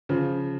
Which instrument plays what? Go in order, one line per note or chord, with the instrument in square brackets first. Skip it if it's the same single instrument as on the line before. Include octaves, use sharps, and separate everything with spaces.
[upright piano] C#3 F3